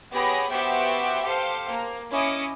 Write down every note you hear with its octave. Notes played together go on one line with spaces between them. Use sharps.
B3 G4 G#4 C#5 B5 A#6
B3 F#4 G4 C5 E5 G5
G4 A4 C5 F5
A#3
C#4 E4 D#5 D6 D#6 C#7